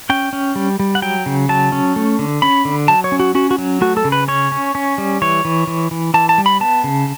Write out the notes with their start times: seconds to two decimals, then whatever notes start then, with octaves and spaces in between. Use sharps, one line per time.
0.10 C#4 G5
0.33 C#4
0.56 G3
0.80 G3
0.95 F#5
1.02 F#3 G5
1.26 C#3
1.49 F#3 A5
1.72 C#4
1.96 A3
2.19 D3
2.42 C#4 B5
2.65 D3
2.88 F#3 A5
3.04 C#5
3.12 C#4
3.20 F#4
3.35 C#4 F#4
3.51 F#4
3.58 F#3
3.81 A3 F#4
3.97 A4
4.05 C#3
4.12 B4
4.28 C#4 C#5
4.52 C#4
4.75 C#4
4.98 G3
5.22 E3 C#5
5.45 E3
5.67 E3
5.91 E3
6.14 E3 A5
6.29 A5
6.38 G3
6.46 B5
6.60 B3 A5
6.84 C#3